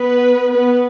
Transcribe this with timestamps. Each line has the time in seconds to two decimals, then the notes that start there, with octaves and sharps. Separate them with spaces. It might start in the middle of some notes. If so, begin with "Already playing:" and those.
Already playing: B3 B4
0.53 B3 B4